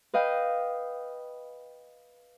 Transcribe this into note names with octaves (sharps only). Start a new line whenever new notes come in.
B4 D#5 F5 G5